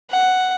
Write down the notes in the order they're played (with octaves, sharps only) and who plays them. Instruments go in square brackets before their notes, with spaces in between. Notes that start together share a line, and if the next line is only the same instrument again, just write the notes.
[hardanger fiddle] F#5